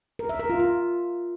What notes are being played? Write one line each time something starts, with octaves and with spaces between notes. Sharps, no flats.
A#4
E5
A#4
F4
F4